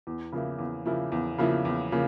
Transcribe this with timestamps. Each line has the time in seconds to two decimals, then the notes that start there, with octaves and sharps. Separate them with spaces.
0.07 E2
0.32 C#3 F3 A#3 E4
0.59 E2
0.86 C#3 F3 A#3 E4
1.12 E2
1.38 C#3 F3 A#3 E4
1.65 E2
1.92 C#3 F3 A#3